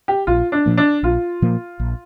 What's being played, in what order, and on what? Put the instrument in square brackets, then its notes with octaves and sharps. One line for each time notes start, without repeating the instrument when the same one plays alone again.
[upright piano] G4
[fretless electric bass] A#1 [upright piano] F4
[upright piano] D4
[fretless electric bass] A#2 F3 A#3
[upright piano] D4
[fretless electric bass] A#1 [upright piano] F4
[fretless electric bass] A#2 F3 A#3
A#1